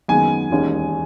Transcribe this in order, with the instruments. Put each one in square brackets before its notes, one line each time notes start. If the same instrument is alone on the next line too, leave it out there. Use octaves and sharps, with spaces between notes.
[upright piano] F#2 D#3 G#3 B3 [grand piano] G#5
[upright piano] E1 D#2 D#3 G#3 C#4